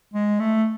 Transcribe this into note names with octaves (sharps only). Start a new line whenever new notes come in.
G#3
A3